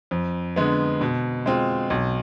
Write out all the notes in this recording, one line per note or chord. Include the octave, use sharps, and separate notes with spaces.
F2
D3 G#3 B3
B2
G#3 C4 F4
B1